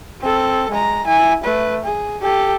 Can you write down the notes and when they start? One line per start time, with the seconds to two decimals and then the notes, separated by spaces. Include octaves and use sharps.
0.21 C4 A4
0.71 G#3 A#5
1.07 E4 G#5
1.44 A3 B4
1.85 G#4
2.22 G4 A4